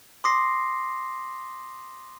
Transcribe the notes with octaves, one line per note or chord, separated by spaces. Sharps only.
C6 D6 D#6 A#6 C7